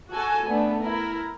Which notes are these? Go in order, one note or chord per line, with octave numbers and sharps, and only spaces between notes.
F#4 A4 G#5
A3 B3 D4
E4 A#4